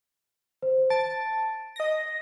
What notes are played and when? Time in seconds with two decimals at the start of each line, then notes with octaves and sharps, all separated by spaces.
0.62 C5
0.90 A5 D7
1.76 D#5 A#6